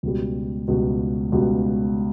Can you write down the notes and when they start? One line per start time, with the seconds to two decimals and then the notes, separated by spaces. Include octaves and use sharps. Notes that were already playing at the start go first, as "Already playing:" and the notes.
0.03 C#2 B2 G3
0.68 C#2 B2 G3
1.32 C#2 B2 G3